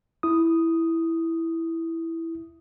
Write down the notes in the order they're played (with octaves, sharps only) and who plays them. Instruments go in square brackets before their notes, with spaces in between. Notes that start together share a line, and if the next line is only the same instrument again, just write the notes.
[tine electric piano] E4 D#6